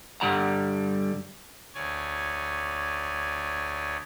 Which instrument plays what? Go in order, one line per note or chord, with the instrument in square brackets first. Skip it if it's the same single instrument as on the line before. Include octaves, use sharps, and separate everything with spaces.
[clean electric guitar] G2 D3 G3 D5 F#5 A#5
[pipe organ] D2 C#5 D5 G#5